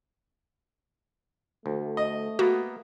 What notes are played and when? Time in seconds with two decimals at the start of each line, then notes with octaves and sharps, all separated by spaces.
1.66 D2 A3
1.97 D#5
2.39 A#3 B3 F#4